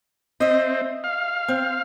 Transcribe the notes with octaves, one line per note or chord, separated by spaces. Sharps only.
C4 D#5 E5
F5
C4